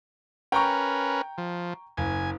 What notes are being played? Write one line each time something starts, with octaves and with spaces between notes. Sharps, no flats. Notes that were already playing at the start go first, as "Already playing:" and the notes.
C#4 A#4 B4 G5 A#5 C#6
F3
F#1 G#5